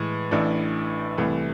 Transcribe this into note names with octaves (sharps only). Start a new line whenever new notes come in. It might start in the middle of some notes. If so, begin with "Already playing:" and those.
Already playing: A2 E3 G#3
A1 A2 E3 A3 D4
C2 C3 E3 A3